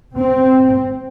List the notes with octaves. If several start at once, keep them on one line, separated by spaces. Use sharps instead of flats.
C4